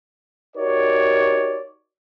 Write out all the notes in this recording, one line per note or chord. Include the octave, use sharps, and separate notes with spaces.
D#4 F#4 G4 A#4 C#5 D5